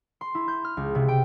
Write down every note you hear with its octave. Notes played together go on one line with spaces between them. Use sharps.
C6
E4
G6
F6
C#2
C3
G5